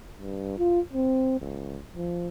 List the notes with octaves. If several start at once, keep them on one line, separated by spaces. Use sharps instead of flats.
G2
F4
C4
C#2
F3